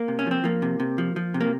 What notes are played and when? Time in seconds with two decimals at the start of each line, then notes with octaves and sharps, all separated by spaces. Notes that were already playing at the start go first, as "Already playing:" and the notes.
Already playing: A#3
0.08 C3
0.19 C#4
0.26 F3 C4
0.44 F3 A#3
0.62 C3
0.80 C3
0.98 F3
1.16 F3
1.34 C3
1.41 A#3